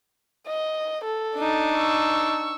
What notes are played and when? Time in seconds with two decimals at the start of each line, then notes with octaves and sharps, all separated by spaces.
0.47 D#5
1.04 A4
1.36 D4 D#4
1.75 C#6 E6